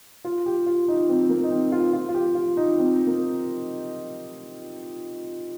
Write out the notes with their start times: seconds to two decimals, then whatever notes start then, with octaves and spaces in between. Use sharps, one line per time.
0.24 F4
0.46 G4
0.66 F4
0.88 D#4
1.09 C4
1.29 A#3
1.44 D#4
1.51 C4
1.72 F4
1.93 F4
2.09 F4
2.14 G4
2.35 F4
2.57 D#4
2.78 C4
3.07 A#3